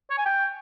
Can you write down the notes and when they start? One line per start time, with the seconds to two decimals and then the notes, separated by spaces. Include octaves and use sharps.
0.10 C#5
0.18 G#5
0.26 G5